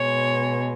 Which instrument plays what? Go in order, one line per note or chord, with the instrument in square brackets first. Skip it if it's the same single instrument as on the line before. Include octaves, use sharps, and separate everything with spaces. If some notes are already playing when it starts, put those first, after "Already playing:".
Already playing: [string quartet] B2 G#3 C#5